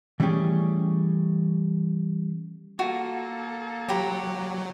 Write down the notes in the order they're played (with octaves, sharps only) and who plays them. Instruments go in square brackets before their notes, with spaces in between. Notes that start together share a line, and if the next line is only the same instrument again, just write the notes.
[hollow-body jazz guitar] E3 G3 A3 C#4 G4 G#4
[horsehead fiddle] A#3 A4 [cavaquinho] F4 F#4
[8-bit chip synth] F#3 [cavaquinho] G4 A#5 B5